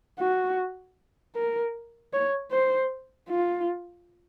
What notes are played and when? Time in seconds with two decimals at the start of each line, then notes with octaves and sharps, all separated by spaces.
0.20 F#4
1.36 A#4
2.13 C#5
2.52 C5
3.29 F4